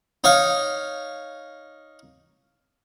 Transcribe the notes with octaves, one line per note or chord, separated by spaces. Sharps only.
D#4 C#5 F5